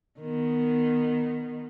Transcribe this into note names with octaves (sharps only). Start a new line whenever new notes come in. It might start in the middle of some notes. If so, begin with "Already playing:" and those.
D#3 B3